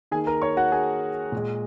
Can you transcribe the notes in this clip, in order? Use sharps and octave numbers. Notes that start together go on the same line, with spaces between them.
D#3 A#3 G#4 G#5
A#4 A#5
C#5 C#6
F#4 F#5
G#4 G#5
A#2 G#3